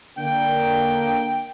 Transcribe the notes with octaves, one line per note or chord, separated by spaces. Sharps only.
D3 A#3 D4 G5